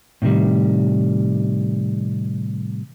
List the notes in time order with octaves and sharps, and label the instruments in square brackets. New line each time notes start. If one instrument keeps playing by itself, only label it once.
[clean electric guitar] A2 C3 D#3 G3